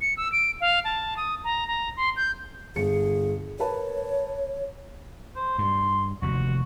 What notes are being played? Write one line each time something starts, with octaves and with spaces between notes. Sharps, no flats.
C#7
E6
D7
F5
A5
D#6
A#5
A#5
C6
G6
G1 G#4 C#7
A#4 B4 C#5 A5
C5
G2 C6
F1 D#2 F#4